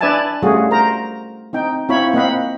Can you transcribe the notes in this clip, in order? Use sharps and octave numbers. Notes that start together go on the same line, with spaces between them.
D4 B4 D5 E5 G#5 A5
G3 A3 C#4 F4 F#4 G#4
A#4 C5 A#5
C4 D#4 G5
C4 E4 F4 C#5 B5
A#3 C4 D#5 F5 F#5 B5